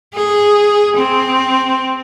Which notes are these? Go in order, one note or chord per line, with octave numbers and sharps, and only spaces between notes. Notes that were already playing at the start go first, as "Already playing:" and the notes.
G#4
C4